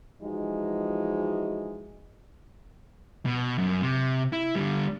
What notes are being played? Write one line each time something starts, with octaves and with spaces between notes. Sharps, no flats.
E3 F3 G#3 D#4 F#4
B2
F#2
C3
E4
D3 G3